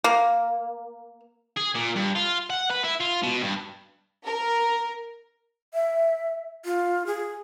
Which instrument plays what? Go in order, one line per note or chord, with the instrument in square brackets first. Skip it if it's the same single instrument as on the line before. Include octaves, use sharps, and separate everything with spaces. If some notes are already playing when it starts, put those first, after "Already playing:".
[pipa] A#3
[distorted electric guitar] G#4
A#2
G2
F4
F#5
B4
E4
F4
B2
G2
[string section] A#4
[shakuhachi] E5
F4
G#4